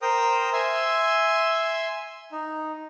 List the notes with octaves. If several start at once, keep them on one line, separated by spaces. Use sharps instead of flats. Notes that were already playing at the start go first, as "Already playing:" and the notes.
A#4 C5 G5 A#5 D#6
E5 G#5 C6 E6
D#4